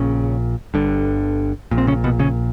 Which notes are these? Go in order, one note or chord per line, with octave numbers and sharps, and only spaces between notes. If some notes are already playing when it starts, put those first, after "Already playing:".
Already playing: A#1 A#2 C#3 C#4
G1 G2 D3
A#1 A#2
C4
C#3 C#4
B2 B3
C#3 C#4